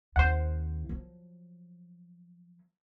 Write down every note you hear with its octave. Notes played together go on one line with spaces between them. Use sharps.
D#2 C4 C5 F#5
F3 F#3